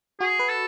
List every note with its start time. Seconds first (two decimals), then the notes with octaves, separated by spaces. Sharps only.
0.20 F#4 G#4
0.39 B4
0.49 A4